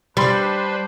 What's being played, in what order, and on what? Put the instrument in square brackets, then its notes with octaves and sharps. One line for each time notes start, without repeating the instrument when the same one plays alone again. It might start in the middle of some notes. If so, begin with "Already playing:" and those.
[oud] G3 [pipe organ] D4 B4 C5 [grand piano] B5 C6